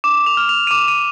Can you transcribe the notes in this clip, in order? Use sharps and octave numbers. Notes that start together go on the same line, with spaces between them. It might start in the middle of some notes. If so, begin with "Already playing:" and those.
D6 E7
F7
F6
F7
D#7
D6 E7
D#7